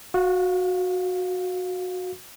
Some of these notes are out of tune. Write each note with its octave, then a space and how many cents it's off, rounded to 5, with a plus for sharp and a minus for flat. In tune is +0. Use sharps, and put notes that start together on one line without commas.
F#4 -15 F5 +10